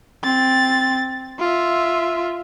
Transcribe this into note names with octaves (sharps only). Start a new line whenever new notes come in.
C4 A6
F4 E5